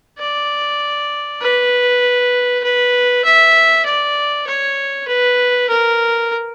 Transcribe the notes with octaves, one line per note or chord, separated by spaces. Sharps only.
D5
B4
B4
E5
D5
C#5
B4
A#4